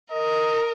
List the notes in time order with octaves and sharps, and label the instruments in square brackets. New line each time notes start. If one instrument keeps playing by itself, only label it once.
[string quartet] A#4 [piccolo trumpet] D#5